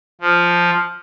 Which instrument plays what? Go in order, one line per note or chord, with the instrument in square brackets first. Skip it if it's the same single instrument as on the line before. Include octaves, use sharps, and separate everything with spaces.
[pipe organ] F3